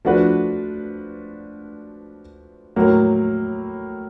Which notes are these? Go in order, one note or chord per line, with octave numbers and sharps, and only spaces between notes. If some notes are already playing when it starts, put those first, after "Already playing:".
F3 A3 D4 F#4 B4
A2 F#3 A#3